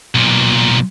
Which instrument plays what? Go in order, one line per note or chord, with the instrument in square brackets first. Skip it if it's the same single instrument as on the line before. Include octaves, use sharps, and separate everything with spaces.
[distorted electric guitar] B1 A#2